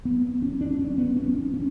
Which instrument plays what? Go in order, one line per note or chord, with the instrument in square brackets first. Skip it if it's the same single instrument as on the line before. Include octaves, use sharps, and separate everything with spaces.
[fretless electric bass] B3
C#4
D4
C#4
B3
C#4
D4
C#4